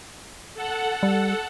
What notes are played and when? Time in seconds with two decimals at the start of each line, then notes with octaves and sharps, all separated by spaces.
0.54 A4 F#5
1.03 G3